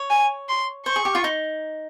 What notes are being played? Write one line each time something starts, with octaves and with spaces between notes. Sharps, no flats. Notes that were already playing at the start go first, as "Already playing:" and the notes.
Already playing: C#5
G#5
C6
C5 C#6
G#4
G4
F4
D#4